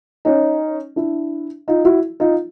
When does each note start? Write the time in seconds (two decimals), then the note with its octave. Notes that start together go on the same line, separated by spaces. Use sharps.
0.25 C#4 D#4
0.96 D4 E4
1.68 D#4 F4
1.85 E4 F#4
2.20 D#4 F4